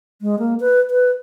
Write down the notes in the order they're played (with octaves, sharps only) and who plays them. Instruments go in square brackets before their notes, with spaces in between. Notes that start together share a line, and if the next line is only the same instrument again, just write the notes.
[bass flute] G#3
A#3
B4
B4